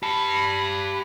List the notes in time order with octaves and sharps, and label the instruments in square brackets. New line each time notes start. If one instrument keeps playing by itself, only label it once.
[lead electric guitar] G4 A5 [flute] B5